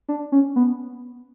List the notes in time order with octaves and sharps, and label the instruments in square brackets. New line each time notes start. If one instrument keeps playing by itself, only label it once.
[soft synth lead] D4
C#4
B3